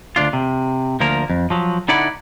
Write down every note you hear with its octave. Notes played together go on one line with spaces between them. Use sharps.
D2 G#2 D4 F4
C3
D2 F3 A#3 A#4
F2
F3 F#3
D3 D#4 E4 D5 F#5 B5